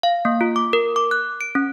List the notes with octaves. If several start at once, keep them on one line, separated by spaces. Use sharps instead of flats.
F5
A#3
F4
D6
A#4
D6
F#6
D7
C#4